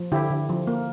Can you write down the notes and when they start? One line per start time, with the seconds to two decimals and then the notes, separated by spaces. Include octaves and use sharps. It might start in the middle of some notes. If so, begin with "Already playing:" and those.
Already playing: F3
0.12 D3 E4 G4
0.30 D3
0.49 F3
0.67 A#3